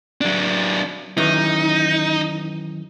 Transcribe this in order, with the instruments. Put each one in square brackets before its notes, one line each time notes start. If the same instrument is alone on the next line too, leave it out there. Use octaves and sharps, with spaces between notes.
[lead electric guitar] F#3 D4
[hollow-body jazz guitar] F#2 D#3 E3 [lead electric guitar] D#4